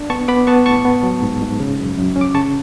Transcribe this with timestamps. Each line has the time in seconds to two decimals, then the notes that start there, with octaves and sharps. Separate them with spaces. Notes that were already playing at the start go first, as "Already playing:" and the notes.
Already playing: D4
0.10 B3 A5 C#6
0.28 B3 B5 D6
0.47 B3 A5 C#6
0.66 A2 A5 C#6
0.85 B3
1.03 F#3
1.22 G#2
1.41 G#2
1.60 C#3
1.79 F#2
1.97 F#2
2.16 C#4
2.21 D6
2.35 C#3 A5 C#6